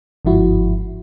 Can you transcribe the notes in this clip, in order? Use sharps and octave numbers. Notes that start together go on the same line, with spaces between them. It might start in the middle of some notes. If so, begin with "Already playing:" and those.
G1 G#2 F3 E4 F#4